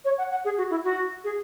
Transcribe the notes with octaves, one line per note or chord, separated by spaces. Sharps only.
C#5
F#5
F#5
G#4
F#4
E4
F#4
G#4